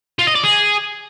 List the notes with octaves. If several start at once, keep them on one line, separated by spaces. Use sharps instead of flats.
F4
D#5
D5
G#4